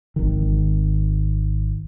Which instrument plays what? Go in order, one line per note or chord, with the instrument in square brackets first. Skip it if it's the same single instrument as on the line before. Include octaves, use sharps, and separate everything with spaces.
[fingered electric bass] G#1 D#3